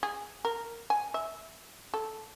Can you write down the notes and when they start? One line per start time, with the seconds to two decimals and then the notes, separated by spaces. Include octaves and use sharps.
0.03 G#4
0.45 A#4
0.90 G#5
1.14 E5
1.94 A4